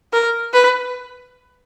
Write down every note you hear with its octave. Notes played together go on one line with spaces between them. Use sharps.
A#4
B4